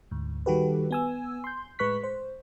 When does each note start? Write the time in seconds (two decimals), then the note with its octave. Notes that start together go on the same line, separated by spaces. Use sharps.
0.11 D2 G#2
0.46 D#3 G3 F#4 G4 A4 B4
0.91 B3 G#5 E6
1.44 C6 G6
1.79 A2 G#3 B4 C#6 F#6 B6
2.04 C5